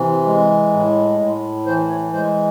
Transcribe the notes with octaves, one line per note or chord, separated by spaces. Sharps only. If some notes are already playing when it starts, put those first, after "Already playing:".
Already playing: C3 E3
G#3
A2
A2
E3 C5
C#5
G#3 C5